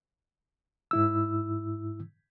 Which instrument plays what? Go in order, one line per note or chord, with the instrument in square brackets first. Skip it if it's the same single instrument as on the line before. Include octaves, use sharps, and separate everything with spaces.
[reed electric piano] G#2 E4 E6